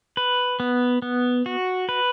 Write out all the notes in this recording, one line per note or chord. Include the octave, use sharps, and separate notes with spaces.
B4
B3
B3
F#4
B4